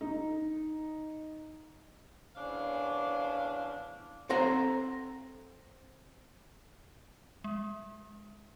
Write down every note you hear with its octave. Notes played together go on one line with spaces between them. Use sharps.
D#4
E2 C#3 C#4 D4 C5 F5
C4 A4 C5 F#5 A#5
G#3